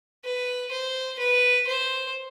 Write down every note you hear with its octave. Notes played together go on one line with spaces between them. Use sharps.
B4
C5
B4
C5